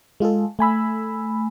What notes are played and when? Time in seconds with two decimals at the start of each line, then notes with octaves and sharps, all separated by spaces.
0.20 G#3 F4 G#4 A4
0.59 A3 G#5 B5 E6